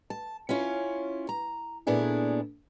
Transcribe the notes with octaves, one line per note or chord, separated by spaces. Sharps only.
A5
C#4 E4 F4 C#5
A#5
A#2 A3 B3 D4 E4 G#4